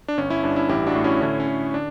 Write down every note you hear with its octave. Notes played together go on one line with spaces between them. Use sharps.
D4
G1 C#4
C#4 E4
G2 D4
C#4 E4
A1 E4 G4
D4 F#4
A2
C#4 E4
D3 C#4 E4
C#4
D3
D4